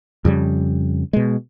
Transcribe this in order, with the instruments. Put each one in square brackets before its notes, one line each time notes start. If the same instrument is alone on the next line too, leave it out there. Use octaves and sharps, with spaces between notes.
[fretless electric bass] F2 C#3 G3
B2 G#3